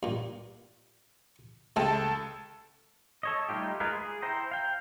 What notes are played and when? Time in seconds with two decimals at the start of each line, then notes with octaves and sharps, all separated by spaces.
0.03 G2 A#2
1.76 C#2 C3 G#3 C4 A4 A5
3.23 A4 C#5 D#5
3.49 G3 A3 D#4 F4 G4
3.80 G#3 F4 G#4 A#4 B4
3.97 G#4
4.22 E4 C5 G5 A#5
4.51 F5 G5